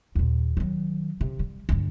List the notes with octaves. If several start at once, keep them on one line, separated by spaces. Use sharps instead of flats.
D#2 A#2
D#3 F#3
C3
G3
D2 G2